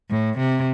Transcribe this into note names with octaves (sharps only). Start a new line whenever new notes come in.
A2
C3